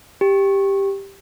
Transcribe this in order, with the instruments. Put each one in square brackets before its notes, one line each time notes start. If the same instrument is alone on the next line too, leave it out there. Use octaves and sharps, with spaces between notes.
[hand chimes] G4